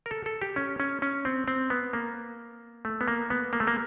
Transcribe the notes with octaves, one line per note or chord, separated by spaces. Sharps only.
A#4
A4
A4
G4
C#4
C#4
C#4
C4
C4
B3
A#3
A3
B3
A#3
B3
A#3
A3
A#3